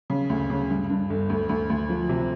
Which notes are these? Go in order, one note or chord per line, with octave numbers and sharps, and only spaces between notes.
C#3
D2
C#3
G2
G2
G1
D2
D2
D2
F3
C3